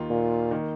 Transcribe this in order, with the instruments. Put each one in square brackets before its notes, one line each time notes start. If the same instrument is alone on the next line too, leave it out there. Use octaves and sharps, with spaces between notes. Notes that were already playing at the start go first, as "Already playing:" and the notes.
Already playing: [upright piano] D#2 D#3 A#3 F4
[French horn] A#2
[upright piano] D#3 A#3